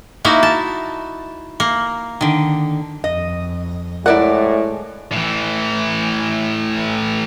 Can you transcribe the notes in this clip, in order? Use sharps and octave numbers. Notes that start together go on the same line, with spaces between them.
A#3 D#4 E4 F#4
A5
A#3
D3 D#3
F2 D#5
A2 G#3 E4 A#4 D5 F#5
A2 E3